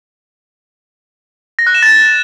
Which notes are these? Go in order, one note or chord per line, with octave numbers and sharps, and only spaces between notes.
A#6
F#6
E7
A6